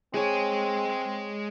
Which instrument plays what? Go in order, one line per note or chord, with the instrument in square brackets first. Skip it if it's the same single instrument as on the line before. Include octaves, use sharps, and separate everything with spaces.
[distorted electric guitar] G#3 G#5 [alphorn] C4 [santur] G#4 C#5